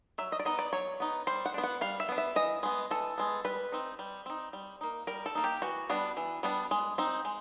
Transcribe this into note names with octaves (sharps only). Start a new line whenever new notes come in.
F#3 E5
D#5
D5
B3 D#4 D#5
D5
F#3 C#5
B3 D#4
G3 C5
F#5
B3 D4
F#5
G3 F5
E5
B3 D4
E5
E3 D#5
G#3 B3
E3 A4
G#3 B3
G3 B4
C4 D#4
G3
C4 D#4
G3
A#3 D#4
G3 A#4
A4
A#3 D#4
G4
E3 F#4
G3 B3 D4
E3
G3 B3 D4
G#3
C4 D#4
G#3